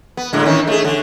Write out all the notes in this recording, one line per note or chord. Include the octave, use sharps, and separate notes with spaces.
B3
A2 D3 G#3
D#3 E3 C#4
A3 G#4
D3